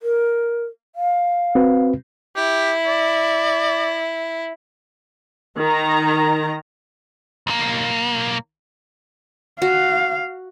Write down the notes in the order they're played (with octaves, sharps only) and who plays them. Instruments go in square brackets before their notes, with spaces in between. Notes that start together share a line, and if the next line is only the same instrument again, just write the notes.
[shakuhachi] A#4
F5
[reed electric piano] C4 F#4 B4
[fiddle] E4 [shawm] G4
[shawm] D5
[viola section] D#3 A#5
[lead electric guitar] B1 A#3
[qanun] F#4 [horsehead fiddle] F5